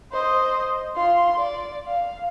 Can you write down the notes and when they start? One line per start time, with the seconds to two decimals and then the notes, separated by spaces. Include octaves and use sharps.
0.12 C5 D#5
0.96 F4 C6
1.39 D5
1.87 F5